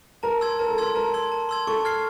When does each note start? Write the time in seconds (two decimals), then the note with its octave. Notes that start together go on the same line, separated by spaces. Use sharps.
0.23 A#4 A5
0.41 C6 E6 G#6
0.59 A#4 A5
0.70 A4
0.78 A#4 C6 E6 G#6
0.95 A#4 A5
1.14 C6 E6 G#6
1.32 A5
1.49 C6 E6 G#6
1.67 A4 C#6
1.85 F6 G#6 C7